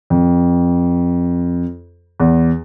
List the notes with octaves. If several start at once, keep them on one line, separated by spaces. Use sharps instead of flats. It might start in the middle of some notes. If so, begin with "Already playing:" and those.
F2
E2